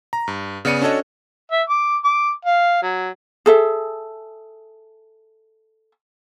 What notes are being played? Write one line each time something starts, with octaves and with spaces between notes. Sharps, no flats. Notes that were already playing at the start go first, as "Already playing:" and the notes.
A#5
G2
C#3 B3 D5 C#7 D#7
C#4 D4 F#4 A4 C#5 D#5
E5
D6
D6
F5
F#3
G#4 A4 E5